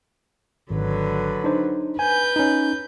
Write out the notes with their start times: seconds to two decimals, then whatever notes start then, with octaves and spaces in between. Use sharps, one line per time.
0.70 G#1 D3 F#3 B4
1.44 D4 D#4 C5
1.99 B4 G#5 G6
2.36 C#4 D#4